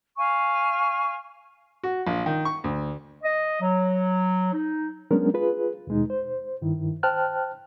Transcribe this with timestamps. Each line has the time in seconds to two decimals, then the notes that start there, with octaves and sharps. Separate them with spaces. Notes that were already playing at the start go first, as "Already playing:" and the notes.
0.16 F5 G#5 C#6
1.83 F#4
2.07 A#1
2.26 D#3
2.45 C#6
2.64 D2
3.23 D#5
3.62 F#3
4.53 D#4
5.11 F#3 G#3 B3 C#4 D4 A#4
5.34 F4 G#4 B4
5.87 D#2 B2 G#3 D#4
6.10 C5
6.62 G2 D#3 E4
7.03 C5 G5 A5 F6 F#6